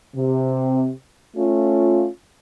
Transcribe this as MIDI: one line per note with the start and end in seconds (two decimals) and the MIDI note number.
0.15 0.91 48
1.36 2.08 57
1.36 2.08 61
1.36 2.08 65